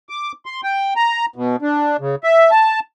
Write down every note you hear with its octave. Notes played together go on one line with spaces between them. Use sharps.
D6
C6
G5
A#5
B2
D4
C#3
E5
A5